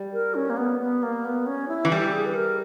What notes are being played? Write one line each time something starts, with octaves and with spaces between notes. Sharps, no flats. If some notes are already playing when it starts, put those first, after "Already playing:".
Already playing: G3
A#4
C#4
A#3
B3
B3
A#3
B3
C#4
E4
E3
G3 G4
G#4
B4
A#4